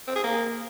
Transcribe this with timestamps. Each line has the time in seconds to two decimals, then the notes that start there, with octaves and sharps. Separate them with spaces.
0.08 C4
0.16 G#4
0.24 A#3